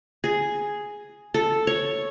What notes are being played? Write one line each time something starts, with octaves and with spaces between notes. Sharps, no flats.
G#4
A4
C#5